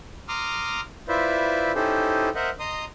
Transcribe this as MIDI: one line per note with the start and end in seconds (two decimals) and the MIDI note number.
0.29 0.81 82
0.29 0.81 84
0.29 0.81 86
0.29 0.81 87
0.29 0.81 89
1.08 1.72 64
1.08 1.72 65
1.08 1.72 71
1.08 1.72 72
1.08 1.72 74
1.08 1.72 76
1.75 2.29 61
1.75 2.29 63
1.75 2.29 64
1.75 2.29 67
1.75 2.29 69
1.75 2.29 72
2.35 2.50 70
2.35 2.50 72
2.35 2.50 75
2.35 2.50 76
2.35 2.50 78
2.59 2.85 75
2.59 2.85 82
2.59 2.85 84
2.59 2.85 87